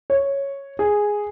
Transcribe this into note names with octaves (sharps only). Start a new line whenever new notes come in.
C#5
G#4